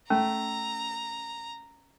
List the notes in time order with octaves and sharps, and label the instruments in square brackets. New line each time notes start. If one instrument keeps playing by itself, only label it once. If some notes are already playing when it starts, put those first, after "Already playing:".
[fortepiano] A3 [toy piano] C#4 [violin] A#5